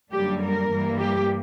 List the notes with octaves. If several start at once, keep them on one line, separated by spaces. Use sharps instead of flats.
F#2 D3 G3 A#3 G4
A#4
G2 E3 G3 A#3
G4